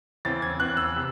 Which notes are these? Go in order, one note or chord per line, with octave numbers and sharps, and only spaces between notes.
E2 C#3 E3 C4 A6
G#6
E2 C#3 E3 C4 F#6
E6
C3